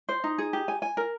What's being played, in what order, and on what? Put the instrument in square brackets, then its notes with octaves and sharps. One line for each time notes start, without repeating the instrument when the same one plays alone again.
[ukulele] C5
D#4
G#4
G4
G#5
G#5
A#4